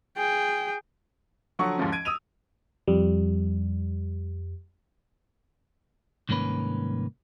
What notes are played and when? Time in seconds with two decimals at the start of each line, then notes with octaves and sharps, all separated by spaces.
0.18 G#4 G5
1.59 D3 F3 F#3 F#5 C#6
1.78 D#2 G#2 F3 C#4
1.92 G#6 D7 D#7
2.05 D#6 E6 D#7 F7
2.88 F2 G3
6.29 C2 G#2 D#3 A#3 C#4 B4